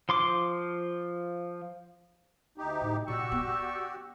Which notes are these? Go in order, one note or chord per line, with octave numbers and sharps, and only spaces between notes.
F3 C6 D6
D2 D#4 G4
A2
A#2 F#4 G4 D5 C#6 E6
B3 D4